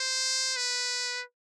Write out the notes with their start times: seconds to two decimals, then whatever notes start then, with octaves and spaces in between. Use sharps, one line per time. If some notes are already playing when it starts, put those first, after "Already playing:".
Already playing: C5
0.56 B4